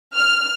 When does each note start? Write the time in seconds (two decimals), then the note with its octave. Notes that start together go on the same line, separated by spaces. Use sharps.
0.16 F6